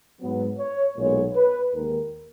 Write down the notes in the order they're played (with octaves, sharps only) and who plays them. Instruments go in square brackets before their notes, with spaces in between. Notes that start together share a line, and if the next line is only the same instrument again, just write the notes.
[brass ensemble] G#2 F#3 B3
C#5
B1 A#2 G#3 B3 C#5
B4
D#2 D#3 G#3 A#4